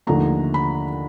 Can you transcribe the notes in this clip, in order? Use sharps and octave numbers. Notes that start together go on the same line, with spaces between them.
D#2 D3 F3 A3 A#5
B5